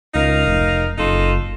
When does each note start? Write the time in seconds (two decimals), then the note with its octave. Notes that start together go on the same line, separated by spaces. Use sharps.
0.15 C#2 D#4 A#4 F5
0.47 F1
0.98 F#1 D#4 F4 A4